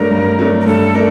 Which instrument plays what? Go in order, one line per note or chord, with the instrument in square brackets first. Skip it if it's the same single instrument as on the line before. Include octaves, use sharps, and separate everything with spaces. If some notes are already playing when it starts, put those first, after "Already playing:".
Already playing: [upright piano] G2 F#3 A3 D4 [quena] A#4
[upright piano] G2
F#3 A3 D4
[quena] A#4
[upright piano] G2 [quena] A4
[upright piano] A3 D4 [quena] A#4